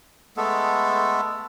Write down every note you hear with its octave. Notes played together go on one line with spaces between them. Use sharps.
G#3 A3 B3 A4